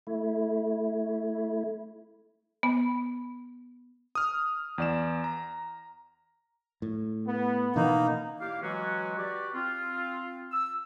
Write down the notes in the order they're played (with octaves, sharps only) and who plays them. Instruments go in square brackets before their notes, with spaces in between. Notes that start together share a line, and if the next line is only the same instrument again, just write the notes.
[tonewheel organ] A3 E4
[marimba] B3
[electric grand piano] D#6 F6
E2 D5 E7
A#5
[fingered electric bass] A2
[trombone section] B3
[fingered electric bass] B2 E3 C#4 [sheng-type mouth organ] A#3 D#4 [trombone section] B3
[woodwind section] A#3 E4 G4 D5 F5
E3 F#3 G#3 C#4 F#4
F#4 G4 B4 D5
C4 F4
E6